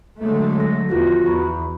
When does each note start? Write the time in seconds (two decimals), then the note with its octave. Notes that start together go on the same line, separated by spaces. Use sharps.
0.19 D3 F#3 G#3 A3
0.60 A#6
0.89 E2 F3 F4 F#4 G#4 A#6
1.26 E2 A#5 B5 C#6